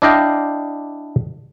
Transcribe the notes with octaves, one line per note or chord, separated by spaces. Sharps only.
D4 E4 D5 D#5 F5 G5